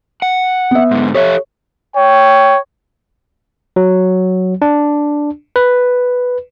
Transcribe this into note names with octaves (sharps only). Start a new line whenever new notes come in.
F#5
B3 E5
G#2 D3
G4 A4 C#5 E5
C#5 G5
F#3
D4
B4